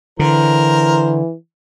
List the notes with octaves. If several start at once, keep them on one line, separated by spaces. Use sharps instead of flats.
D3 E3 A#4 C5